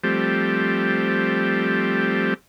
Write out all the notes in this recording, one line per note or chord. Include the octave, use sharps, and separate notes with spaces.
F3 G3 A3 C4 G4